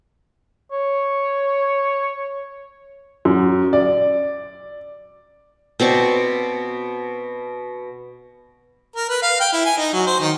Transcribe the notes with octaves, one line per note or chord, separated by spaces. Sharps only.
C#5
F#2
D5
B2 C4 D5 C#6
A#4
B4
F5
G5
E4
G#5
D#4
F#3
C5
D#3